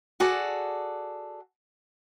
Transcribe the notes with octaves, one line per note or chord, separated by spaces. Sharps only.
F#4 G#4 A4 D5